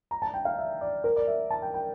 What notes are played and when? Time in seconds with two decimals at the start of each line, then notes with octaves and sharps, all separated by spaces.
0.11 A#5
0.22 A5
0.34 G5
0.45 F5
0.58 E5
0.81 D5
1.04 A#4
1.16 D5
1.27 E5
1.50 A5
1.62 G5
1.74 G5